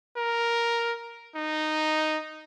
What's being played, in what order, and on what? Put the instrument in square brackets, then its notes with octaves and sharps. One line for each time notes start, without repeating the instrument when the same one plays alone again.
[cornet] A#4
D#4